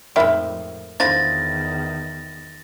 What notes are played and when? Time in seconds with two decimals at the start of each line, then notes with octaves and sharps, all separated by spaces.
0.16 F2 A2 G#3 D#4 G4 A#4 E5 B5
1.00 E2 D3 D#3 F3 E4 A6 A#6